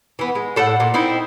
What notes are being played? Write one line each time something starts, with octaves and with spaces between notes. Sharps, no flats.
E3 B3
G#3
A2 A4 D5 F#5
A#2
C4 D#4 E4